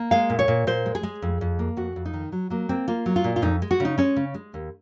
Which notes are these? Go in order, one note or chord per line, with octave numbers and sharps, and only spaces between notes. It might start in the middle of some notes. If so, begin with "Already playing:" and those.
Already playing: A#3
G#3 F5
A#2
C#5
A#2
A#2 C5
G#3
G#4
G#3
F2
F2
A#3
F2 F#4
F2
D#4
D#3
F#3
F#3 A#3
A#3 C4
A#3 F4
F#3
F4
A#2
F4
F2 D#4
G#3
F#4
C#3 D#4
G#3 C#4
C#3
G#3
D#2